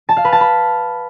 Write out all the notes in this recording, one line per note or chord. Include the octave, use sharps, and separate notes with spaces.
A5
F5
B4
A5
B5